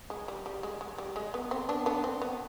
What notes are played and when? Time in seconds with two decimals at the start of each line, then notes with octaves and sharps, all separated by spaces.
0.10 G#3
0.28 G3
0.46 G3
0.63 G#3
0.81 G#3
0.98 G3
1.16 G#3
1.34 B3
1.51 C4
1.69 B3 D4
1.86 B3 D4
2.04 C4
2.22 B3